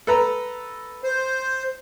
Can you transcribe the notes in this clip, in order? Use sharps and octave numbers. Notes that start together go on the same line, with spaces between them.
A4 B4 A#5
C5